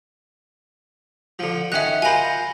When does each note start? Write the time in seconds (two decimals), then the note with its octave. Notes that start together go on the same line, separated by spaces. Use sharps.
1.39 D3 F3
1.72 D#3 C#4 E5 F#5 F#6
2.02 F4 A#4 C5 G#5 B5